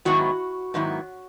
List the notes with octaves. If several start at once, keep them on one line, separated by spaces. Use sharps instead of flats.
G#2 D#3 F#3 B3 E4 F#4
G#2 D#3 F#3 B3 E4